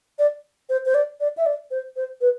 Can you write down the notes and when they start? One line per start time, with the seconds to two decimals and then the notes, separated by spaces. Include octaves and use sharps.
0.19 D5
0.69 C5
0.86 C5
0.94 D5
1.20 D5
1.37 E5
1.46 D5
1.71 C5
1.96 C5
2.21 B4